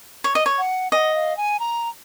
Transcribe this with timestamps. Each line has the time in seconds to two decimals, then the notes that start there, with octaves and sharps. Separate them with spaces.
0.24 C#5
0.35 D#5
0.46 C#5
0.58 F#5
0.92 D#5 G#5
0.96 F#5
1.15 F5
1.37 G#5
1.60 A#5